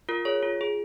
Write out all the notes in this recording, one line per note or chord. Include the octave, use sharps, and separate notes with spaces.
F4 A#4
G#4 C#5
F4
G#4